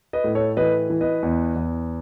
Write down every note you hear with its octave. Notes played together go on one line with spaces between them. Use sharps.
B4 D#5
A2
A4 C#5
E3 B4 D#5
E3
B4 D#5
E2
E2